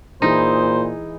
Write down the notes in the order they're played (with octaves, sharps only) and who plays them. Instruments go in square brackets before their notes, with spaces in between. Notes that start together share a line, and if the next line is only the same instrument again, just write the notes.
[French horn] A#2 [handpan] E3 E4 G#4 [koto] D#4 [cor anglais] C5